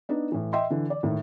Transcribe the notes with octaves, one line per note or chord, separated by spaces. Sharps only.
B3 D4 D#4
A2 E3
D#5 E5 G5 C6
D3 E3
D5
D#2 A2